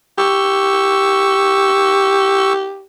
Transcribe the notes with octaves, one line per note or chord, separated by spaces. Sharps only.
G4 C#6 E6